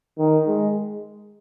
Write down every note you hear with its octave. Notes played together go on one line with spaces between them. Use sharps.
D#3
G#3